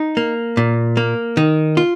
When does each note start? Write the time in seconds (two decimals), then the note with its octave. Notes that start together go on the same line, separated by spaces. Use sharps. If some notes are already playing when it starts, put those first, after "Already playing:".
Already playing: D#4
0.17 A#3
0.57 A#2
0.97 A#3
1.37 D#3
1.77 F4